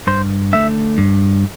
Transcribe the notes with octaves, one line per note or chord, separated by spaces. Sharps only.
G2 C5
D3 A3 E5
G2